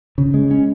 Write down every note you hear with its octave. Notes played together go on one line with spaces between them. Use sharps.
C#3
G#3
C#4